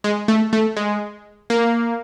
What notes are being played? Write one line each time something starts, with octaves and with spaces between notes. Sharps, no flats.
G#3
A3
A3
G#3
A#3